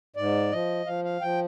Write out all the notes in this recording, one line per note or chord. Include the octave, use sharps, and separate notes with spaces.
G#2 D5
F3 D#5
F3 F5
F5
F3 G5